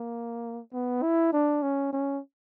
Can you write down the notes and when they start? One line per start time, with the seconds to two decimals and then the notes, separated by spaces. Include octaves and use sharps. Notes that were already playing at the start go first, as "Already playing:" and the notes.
Already playing: A#3
0.73 B3
1.02 E4
1.33 D4
1.62 C#4
1.93 C#4